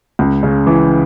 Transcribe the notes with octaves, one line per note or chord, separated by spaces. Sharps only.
C#2
C#3
E3